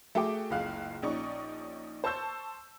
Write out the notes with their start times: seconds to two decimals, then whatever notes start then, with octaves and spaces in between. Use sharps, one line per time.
0.15 A3 F#4 G#4 G5 D6
0.51 F#1 C#2 F5 F#6
1.02 A#1 C#4 D#4 D5 C#6
2.04 C5 A5 C#6 E6 G6